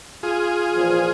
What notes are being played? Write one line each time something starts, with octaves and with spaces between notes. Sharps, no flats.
F4 G#4
A#2 E3 F3